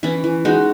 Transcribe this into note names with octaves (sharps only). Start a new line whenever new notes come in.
E3 C#4 E4
E3
G#3 D#4 F#4